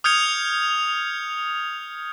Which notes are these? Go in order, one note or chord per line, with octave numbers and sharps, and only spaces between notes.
D#6 F6 G6 G#6 C#7 F7